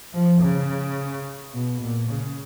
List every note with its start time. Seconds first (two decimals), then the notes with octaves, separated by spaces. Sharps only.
0.13 F3
0.41 C#3
1.54 B2
1.82 A#2
2.10 C#3